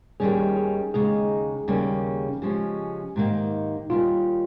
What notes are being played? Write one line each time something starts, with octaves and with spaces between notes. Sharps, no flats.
D#2 D#3 G3 C#4 G#4
G#4
D#2 C#3 G#3 D#4 G#4
D#2 C#3 G3 A#3 C#4
C#3 F3 G#3 C#4 G4
G#2 D#3 A#3 D#4
D#2 D#3 G3 C#4 F4